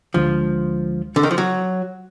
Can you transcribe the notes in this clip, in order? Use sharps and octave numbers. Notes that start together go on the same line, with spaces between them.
D2 D3 F3 G#3
D3
D#3
F3
F#3